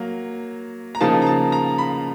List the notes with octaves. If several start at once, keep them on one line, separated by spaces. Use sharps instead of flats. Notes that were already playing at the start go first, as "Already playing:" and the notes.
Already playing: F#3 A#3
A#5
C#3 F3 A#3 D#4 A5
A#5
A5
A#5
B5